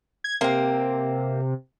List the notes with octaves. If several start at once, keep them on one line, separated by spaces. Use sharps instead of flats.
G#6
C3 A#3 C4